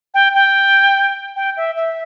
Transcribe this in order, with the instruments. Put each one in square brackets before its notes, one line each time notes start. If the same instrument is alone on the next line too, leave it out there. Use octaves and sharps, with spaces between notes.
[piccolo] G5
G5
G5
E5
E5